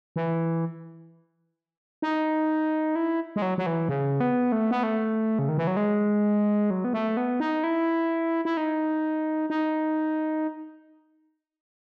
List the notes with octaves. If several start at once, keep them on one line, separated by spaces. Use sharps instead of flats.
E3
D#4
E4
G#3
F#3
F#3
E3
C#3
B3
A3
B3
A3
C#3
D#3
E3
F#3
G#3
F#3
B3
A3
B3
D#4
E4
E4
D#4
D#4